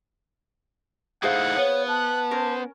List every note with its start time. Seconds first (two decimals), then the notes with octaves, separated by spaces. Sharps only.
1.23 A3 D#4 E4 G#4 C5 F5 F#5
1.57 B3 C#5
1.88 A5 F#6
2.31 C#4 A#4 C5